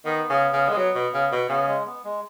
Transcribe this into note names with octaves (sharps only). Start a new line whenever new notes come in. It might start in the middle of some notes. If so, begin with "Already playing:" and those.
D#3 B3
C#3
C#3
G#3
F#3
B2
C#3
B2
C#3 B3
G#3
B3
G#3